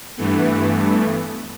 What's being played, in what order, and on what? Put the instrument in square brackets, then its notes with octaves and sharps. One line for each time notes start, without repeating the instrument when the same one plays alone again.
[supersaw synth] G2 E3 A3 B3